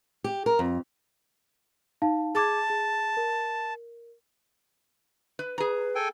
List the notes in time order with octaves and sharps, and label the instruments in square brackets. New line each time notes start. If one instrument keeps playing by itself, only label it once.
[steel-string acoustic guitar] G4
A#4
F2
[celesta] D#4 F5 A5
[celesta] G#4 D6 G#6 [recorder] A5
[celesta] G#4
A#4
[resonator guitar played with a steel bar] B4
[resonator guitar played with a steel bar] G#4 A#5 [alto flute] B4
[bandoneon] A4 G5 G#5